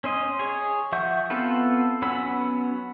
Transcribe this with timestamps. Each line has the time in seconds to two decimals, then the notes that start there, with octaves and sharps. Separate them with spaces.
0.04 C#4 C5 D#5
0.39 G#4 C#5
0.92 F3 E5 F#5 C#6 G6
1.30 B3 C4 F4 A4 B4
2.02 F#3 B3 C#4 B5 E6